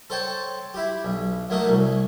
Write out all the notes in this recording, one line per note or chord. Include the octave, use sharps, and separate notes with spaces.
A4 C5 C#5 G5 A5
E4 G4
B1
F#3 A3 A#3 D#4 A4
C2